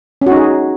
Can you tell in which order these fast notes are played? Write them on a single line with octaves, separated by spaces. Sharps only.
C#4 F#4 D#4 G#4